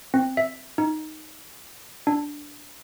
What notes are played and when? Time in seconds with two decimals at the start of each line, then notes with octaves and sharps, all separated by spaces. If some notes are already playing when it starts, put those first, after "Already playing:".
0.14 C4
0.37 E5
0.78 D#4
2.07 D4